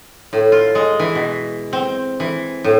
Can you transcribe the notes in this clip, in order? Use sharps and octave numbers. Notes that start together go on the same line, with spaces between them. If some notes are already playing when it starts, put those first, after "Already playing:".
A2
F4
G#3
E3
B2
C4
E3
A2